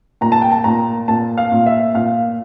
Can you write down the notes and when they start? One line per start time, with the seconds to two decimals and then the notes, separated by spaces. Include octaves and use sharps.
0.21 A#2 A#5
0.32 A5
0.42 G5
0.52 A5
0.64 A#2 A#5
1.08 A#2 A5
1.38 F5
1.52 A#2
1.66 E5
1.95 A#2 F5